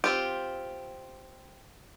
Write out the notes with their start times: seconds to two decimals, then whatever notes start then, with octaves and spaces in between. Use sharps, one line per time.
0.04 C4 F4 G4